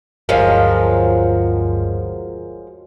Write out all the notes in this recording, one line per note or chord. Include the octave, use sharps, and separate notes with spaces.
G1 D2 F3 F#3 G#3 A#4 F5